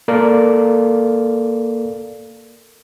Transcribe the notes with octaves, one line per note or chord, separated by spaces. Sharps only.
A#3 A4 A#4 D5 F5